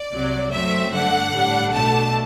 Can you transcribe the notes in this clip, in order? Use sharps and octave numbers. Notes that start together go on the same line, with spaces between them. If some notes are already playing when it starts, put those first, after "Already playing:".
Already playing: D5
C2 C3 F#3
F#2 F#3 A3 C4 E5
G2 D3 A3 D4 F#5
A2 G3 D4
B1 B2 A3 D4 A5